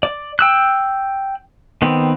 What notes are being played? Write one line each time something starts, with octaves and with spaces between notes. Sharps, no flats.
D5
G5 E6 F#6
D#3 B3 C4